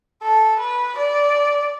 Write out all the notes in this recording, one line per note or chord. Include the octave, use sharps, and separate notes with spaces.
A4
B4
D5